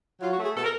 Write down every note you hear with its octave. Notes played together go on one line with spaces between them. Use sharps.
F#3 F4
F#4
A3
G#4
B2 A4
A#4